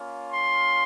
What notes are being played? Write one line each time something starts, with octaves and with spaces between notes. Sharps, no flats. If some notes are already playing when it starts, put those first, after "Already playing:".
Already playing: A#3 C#4 F4
C6